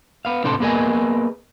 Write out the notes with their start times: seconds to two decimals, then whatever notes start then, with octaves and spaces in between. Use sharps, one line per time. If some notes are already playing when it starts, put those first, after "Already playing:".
0.25 B3 F5
0.44 A2 C3 D4 A4 C5
0.60 A#3 B3 G#4 A#4 D#5 G#5